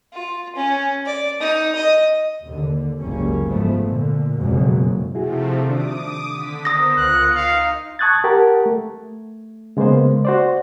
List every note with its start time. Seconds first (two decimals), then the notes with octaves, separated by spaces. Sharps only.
0.13 F4
0.55 C#4
1.06 D5
1.40 D#4
1.76 D#5
2.45 D#2 D3
3.02 F#1 C#2 G3 A#3 C#4
3.47 G#2 F3 A3 B3
3.83 A#2 D3
4.36 F#1 F2 B2 F#3 G#3
5.15 C3 F3 A3 E4 F#4 G#4
5.67 D#3 D4 D6 D#6
6.30 D3 B6
6.65 B3 A#4 C5 D#6 A#6
6.97 C#2 F4 F6 F#6 C#7
7.35 D#4 F5
7.99 A5 C#6 D#6 F#6 G#6 A6
8.24 G4 A#4 F#5 A5
8.66 A3
9.77 C#3 G#3 A#3 B3 C5
10.25 F#4 C5 D5